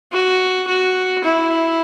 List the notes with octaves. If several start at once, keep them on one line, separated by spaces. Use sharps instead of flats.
F#4
F#4
E4